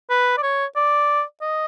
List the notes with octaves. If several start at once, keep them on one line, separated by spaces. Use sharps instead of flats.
B4
D5
C#5
D5
D#5